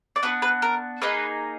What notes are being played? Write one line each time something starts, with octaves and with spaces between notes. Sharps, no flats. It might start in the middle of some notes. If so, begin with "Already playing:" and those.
D5
B3 D4 F#4 B4
B4
A#4
A#3 D#4 G#4 B4